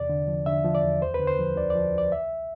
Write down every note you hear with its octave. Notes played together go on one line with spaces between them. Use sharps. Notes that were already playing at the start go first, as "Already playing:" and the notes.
Already playing: E2 C3 D5
D3
F3
D3 E5
F3
D5
E2
D2 C5
B4
D3
C5
F3
D2 D5
D5
F3
D2 D5
C2 E5